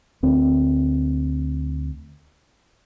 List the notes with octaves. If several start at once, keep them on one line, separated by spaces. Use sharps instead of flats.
D2 C4